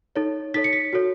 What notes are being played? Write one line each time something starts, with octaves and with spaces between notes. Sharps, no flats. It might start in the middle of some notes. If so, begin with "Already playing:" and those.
D#4 A4 C#5
D#4 A4 C#5 B6
C#7
B6
F#4 A4 C#5